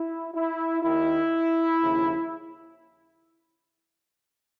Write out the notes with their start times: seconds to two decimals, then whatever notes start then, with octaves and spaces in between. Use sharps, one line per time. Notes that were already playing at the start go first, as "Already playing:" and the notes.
Already playing: E4
0.34 E4
0.83 D#2 D#3 E4
1.79 D#2 C#3 F3